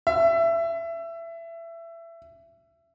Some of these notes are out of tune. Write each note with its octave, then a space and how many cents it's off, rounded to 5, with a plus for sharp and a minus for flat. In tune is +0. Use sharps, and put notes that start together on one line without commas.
E5 +20